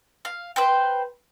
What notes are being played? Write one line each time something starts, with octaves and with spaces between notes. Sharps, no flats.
F5
B4 C5 G5